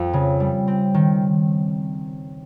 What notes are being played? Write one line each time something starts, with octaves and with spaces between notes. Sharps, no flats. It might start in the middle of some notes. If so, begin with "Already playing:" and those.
Already playing: F2 F3
C#3
G3
C4
D#3